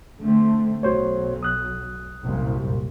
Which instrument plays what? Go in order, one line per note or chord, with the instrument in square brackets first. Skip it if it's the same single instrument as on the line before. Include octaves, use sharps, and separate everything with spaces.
[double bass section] D3 A3 C4
[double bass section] B1 F#3 [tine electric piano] F#4 C5 C#5
[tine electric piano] D#6 F#6
[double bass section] C2 F#2 A#2